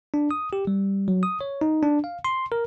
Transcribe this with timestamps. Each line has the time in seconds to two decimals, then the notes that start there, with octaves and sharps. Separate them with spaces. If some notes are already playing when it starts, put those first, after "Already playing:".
0.14 D4
0.31 D#6
0.53 G4
0.67 G3
1.08 F#3
1.23 D#6
1.41 C#5
1.61 D#4
1.83 D4
2.04 F5
2.25 C6
2.52 A#4